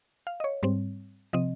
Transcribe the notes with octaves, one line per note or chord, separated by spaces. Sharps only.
F5
D#5
C#5
G#2 G3 C4
C3 F3 C4 D#5